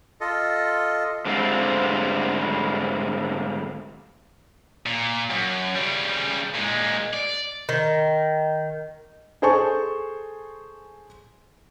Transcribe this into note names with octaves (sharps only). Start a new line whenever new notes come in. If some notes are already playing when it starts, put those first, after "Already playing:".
F4 A4 D#5
G#2 D3 G3 A3 C4 F4
A#2
F#2
C#3 G3
A#2 G#3
D5
D#3
G#4 A4 C5 G#5 A5 C#6